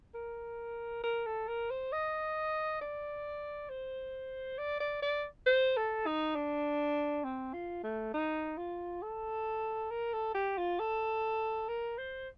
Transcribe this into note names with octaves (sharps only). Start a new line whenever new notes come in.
A#4
A#4
A4
A#4
C5
D#5
D5
C5
D5
D5
D5
C5
A4
D#4
D4
C4
F4
A3
D#4
F4
A4
A#4
A4
G4
F4
A4
A#4
C5